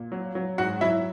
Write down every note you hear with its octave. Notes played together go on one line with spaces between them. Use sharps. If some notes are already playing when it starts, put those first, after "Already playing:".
Already playing: A#2
F#3
F#3
G#2 F#4 F#5
F#3 E4 E5